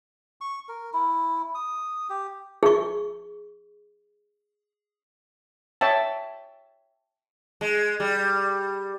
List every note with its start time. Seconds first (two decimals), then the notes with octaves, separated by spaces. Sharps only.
0.41 C#6
0.69 A#4
0.94 E4
1.55 D#6
2.10 G4
2.63 G#4 C#6
5.81 C#5 E5 G5 A5
7.61 G#3
8.00 G3